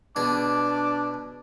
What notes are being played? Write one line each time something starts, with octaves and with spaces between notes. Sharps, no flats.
B2 D4 G#4 G#5 D6